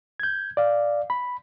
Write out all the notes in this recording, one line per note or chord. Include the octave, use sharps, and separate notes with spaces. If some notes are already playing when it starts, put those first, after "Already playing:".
G6 G#6
D5 F5
B5